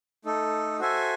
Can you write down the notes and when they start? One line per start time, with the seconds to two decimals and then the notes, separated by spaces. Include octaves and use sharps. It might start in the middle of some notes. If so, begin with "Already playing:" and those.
0.25 A3 D#4 A4
0.79 F#4 A4 C5 E5 G#5